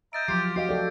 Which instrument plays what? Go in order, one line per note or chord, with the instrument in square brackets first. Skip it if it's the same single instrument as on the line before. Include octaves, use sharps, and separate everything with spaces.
[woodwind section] D#5 E5 A#5 [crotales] G6 A6 D7
[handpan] F3 F#3 [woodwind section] F4 G4 [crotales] C7
[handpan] F#4 D#5 F5 [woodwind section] G4 [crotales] C7
[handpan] F#3 A4 D5